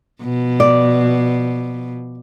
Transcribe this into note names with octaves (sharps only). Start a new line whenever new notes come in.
B2 F3
D5